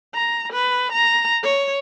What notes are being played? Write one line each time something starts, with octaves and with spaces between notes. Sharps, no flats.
A#5
B4
A#5
C#5